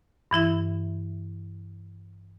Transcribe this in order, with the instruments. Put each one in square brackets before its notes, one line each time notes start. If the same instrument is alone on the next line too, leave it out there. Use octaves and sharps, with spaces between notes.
[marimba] G2 E3 E4 E5